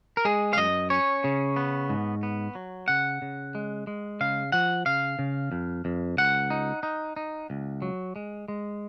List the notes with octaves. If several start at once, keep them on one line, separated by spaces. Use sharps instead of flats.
A#4
G#3 G#4
F5
F#2 D#5
C#4 C#5
C#3
B3
G#2
B3
F#3
C#3 F#5
C#3
G#3
G#3
C#3 F5
F3 F#5
C#3 F5
C#3
F2
F2
C#2 F#5
D#4
D#4
D#4
C#2
F#3
G#3
G#3